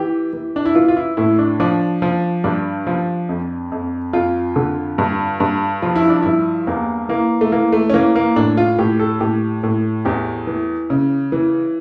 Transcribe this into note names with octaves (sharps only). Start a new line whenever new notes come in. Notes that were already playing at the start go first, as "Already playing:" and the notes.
Already playing: E3 G4
E3
D4
E4
E3 F4
F4
E4
A2 E4
D4
F3 D4
F3
G2 D4
F3
F2
F2
F2 F4
D3
G2
G2
F3 F4
E4
D4
G2 E4
E2 A#3
E3 A#3
A3
E3 A#3
A3
C#4
E3 A#3
A#3
A2 D4
F4
A2 G4
A4
A2 G4
A2
E2 G4
E3
C#3
E3